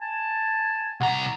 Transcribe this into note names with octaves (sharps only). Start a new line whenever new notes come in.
G#5 A5
C2 F#5 A#5